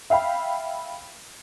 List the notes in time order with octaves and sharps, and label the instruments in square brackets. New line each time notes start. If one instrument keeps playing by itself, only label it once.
[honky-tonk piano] E5 F5 G5 B5